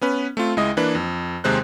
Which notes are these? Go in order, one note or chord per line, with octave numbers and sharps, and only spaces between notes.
B3 C#4 B4
A3 C4 F4
C#2 G#3 E4 D#5 D#6
E3 A#3 D4 B4
F2
D#2 C3 G#3 C5 F#6